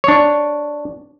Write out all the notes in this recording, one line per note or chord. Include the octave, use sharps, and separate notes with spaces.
D4 C#5